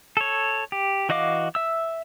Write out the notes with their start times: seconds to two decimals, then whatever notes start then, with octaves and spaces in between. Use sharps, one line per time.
0.17 A4 C#5
0.72 G4
1.09 E3 F#4 D#5 F5 D6
1.55 E5 E6